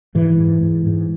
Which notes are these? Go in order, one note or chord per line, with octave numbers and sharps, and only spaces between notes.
G#2 E3
G#2
G#2
G#2